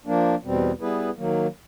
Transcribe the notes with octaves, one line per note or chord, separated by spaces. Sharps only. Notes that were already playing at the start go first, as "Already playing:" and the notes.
F3 A#3 D4
E2 B2 G3 C4
G3 B3 E4 G#4 B4
D#3 F#3 A#3